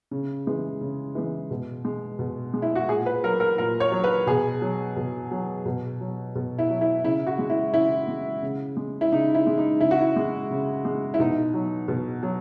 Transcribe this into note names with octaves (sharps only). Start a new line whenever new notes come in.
C#3
E3 G#3
C#3
E3 G#3
B2
G#3
B2
G#3
E4
F#4
A#2 G#4
B4
F#3 A#4
A#4
A#2 A#4
C#5
F#3
B4
B2 G#4
F#3
B2
F#3
B2
F#3
B2
E4
F#3
E4
C#3 E4
F#4
G#3
E4
C#3 E4
G#3
C#3
G#3
E4
C#3 D#4
E4
G#3
D#4
C#3 E4
F#4
E4
G#3
C#3
G#3
E4
B2 D#4
F#3
B2
F#3